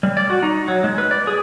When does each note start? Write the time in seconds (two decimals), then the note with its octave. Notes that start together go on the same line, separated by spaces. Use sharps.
0.03 G3
0.17 D5
0.30 F#4
0.43 D#4
0.68 F#3
0.84 G#3
0.98 B4
1.11 D5
1.27 G#4